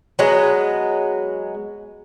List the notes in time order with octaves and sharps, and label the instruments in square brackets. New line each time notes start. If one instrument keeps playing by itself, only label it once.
[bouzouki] F#3 G#3 B3